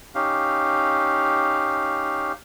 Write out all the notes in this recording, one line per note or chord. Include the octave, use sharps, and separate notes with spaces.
C#4 D#4 G4 F5